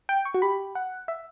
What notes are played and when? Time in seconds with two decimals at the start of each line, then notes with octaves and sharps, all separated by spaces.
0.09 G5
0.25 C#6
0.34 F#4
0.42 G4 B5
0.75 F#5
1.08 E5